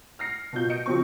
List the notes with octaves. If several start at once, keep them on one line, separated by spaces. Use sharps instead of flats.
F6 A#6 C7 C#7
B2 F#3 F4 G6
D#5 C#7 D7
C#3 F3 C4 C#6